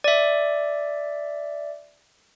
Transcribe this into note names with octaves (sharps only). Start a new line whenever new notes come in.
D5 E5